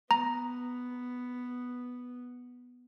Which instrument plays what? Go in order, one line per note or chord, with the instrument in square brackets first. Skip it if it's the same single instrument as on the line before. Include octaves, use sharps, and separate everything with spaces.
[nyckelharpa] B3 [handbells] A#5